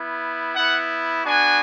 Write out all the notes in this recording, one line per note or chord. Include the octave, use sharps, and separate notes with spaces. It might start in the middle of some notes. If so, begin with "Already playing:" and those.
Already playing: B3 E4
B3 E4 F#5
B3 D4 F#4 G#5